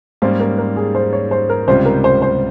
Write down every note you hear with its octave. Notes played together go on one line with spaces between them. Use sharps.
G#2 G3 A#3 C#4 C5
A#4
A#4
G#4
C5
C#5
C5
A#4
C#2 C3 G3 C#4 F4 C5
A#4
C5
C5